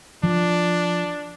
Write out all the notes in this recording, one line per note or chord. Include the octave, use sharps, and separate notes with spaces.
F3 D4